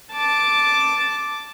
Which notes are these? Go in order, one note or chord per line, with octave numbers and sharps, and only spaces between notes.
A5 D6